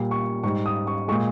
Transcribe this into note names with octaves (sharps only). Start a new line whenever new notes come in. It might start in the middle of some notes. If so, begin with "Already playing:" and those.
Already playing: A#2 G3
C#6
G#2 G3 C#6
D#6
C#6
A#2 G#3 C#6